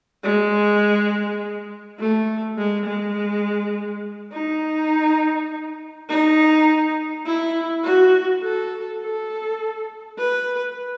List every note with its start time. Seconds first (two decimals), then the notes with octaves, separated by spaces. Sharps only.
0.24 G#3
1.99 A3
2.58 G#3
2.86 G#3
4.32 D#4
6.09 D#4
7.26 E4
7.84 F#4
8.43 A4
9.01 A4
10.18 B4